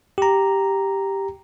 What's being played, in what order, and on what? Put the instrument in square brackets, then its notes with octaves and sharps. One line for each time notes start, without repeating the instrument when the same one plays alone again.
[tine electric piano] G4 A#5